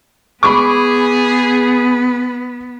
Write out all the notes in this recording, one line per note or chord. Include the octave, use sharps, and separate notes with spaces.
B3 G#4 B5 C#6 D6